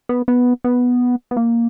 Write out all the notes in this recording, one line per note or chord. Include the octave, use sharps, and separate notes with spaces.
B3
B3
B3
B3
A#3